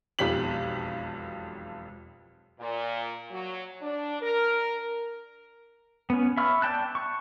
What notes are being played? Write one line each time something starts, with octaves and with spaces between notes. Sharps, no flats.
E1 B1 F2 G4 B6 F#7
A#2
F#3
D4
A#4
B3 C#4
E5 B5 C#6 E6 F6
D5 G5 A5 F#6
C#6